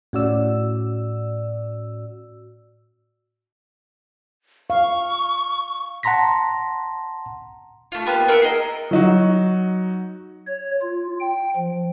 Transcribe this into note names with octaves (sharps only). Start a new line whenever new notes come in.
A2 C#4 F#4 D5 E6
F5 C#6
F#5 A5 A#5 C6 A#6 B6
A3 F4
A#3 B3 F4 G4
A#4 E5 F#5 G5
G#4 A#4 D#5
F#3 D#4 F#4
C#5
F4
G5
F3